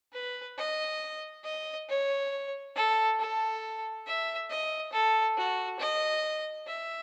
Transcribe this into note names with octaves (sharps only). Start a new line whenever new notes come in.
B4
D#5
D#5
C#5
A4
A4
E5
D#5
A4
F#4
D#5
E5